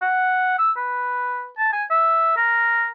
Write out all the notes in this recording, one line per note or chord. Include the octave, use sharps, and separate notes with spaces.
F#5
E6
B4
A5
G#5
E5
A#4